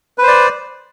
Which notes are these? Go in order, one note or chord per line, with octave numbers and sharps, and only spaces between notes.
B4 C5 D5